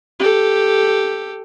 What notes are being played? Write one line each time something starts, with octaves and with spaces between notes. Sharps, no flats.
G4 A4